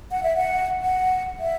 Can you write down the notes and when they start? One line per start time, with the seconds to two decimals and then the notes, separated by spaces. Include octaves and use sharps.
0.11 F#5
0.23 E5
0.37 F#5
0.82 F#5
1.40 E5